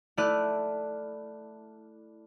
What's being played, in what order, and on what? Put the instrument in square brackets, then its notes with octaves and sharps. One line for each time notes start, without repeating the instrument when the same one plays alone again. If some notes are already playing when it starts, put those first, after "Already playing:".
[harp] A3 E4 D5 F6 F#6 D#7